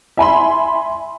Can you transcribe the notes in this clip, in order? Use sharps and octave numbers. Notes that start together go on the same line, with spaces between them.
E5 G#5 B5 C6